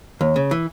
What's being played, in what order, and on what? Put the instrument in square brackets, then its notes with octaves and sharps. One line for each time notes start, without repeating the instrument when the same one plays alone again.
[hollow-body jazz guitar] D#2
C#3
E3